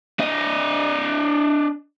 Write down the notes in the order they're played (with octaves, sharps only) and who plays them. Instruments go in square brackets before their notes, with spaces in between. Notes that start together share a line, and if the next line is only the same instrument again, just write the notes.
[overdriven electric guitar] D4 D#5